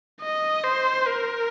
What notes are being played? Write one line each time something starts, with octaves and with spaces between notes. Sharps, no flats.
D#5
C5
A#4